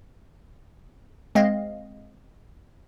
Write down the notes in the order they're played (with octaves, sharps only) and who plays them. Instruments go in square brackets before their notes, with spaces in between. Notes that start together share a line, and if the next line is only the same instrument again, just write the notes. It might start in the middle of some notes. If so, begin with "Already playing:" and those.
[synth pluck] G#3 C4 D#5 F5